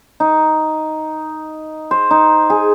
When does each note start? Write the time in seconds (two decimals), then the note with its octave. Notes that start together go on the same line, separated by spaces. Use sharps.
0.20 D#4
1.91 C5
2.11 D#4
2.50 G#4